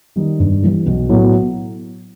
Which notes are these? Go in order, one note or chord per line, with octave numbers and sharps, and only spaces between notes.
D#3 G3 D#4
G2
E3 G3
B1
A2 F#3 B3